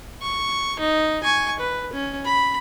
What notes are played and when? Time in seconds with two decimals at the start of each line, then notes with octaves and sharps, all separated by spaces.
0.22 C#6
0.79 D#4
1.23 G#5 C#6
1.60 B4
1.93 C#4
2.25 B5